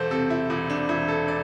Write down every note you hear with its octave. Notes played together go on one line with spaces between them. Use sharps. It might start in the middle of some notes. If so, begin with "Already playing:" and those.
Already playing: E1 A4 C5
C3 A4
E4
E1 E4
D4
E1 E4
A4
D5